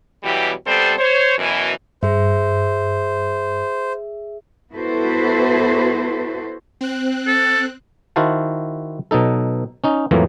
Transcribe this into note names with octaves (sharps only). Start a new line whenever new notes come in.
B2 E3 F#3 G3 G4
C3 G3 B3 A4 C5
C5 C#5
F#2 B2 E3
G2 G#4 C5 E5
B3 E4 F#4 A4 B4 C5
C4 F#6
A4
D#3 E4 F#4 C5 F5 A5
B2 F#3 D#4 A4
C#4 D#4
F2 A2 E3 F#3 A#3